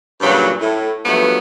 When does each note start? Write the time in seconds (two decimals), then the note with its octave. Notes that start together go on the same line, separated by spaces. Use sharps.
0.21 G2 A#2 C#3 F#3
0.60 A2
1.06 G2 F3 F#3 A3 B3